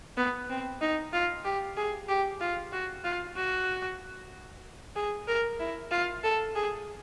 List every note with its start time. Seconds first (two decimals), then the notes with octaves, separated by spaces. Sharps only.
0.17 B3
0.49 C4
0.81 D#4
1.13 F4
1.45 G4
1.77 G#4
2.08 G4
2.41 F4
2.73 F#4
3.04 F4
3.37 F#4
4.96 G#4
5.28 A#4
5.60 E4
5.91 F4
6.24 A4
6.55 G#4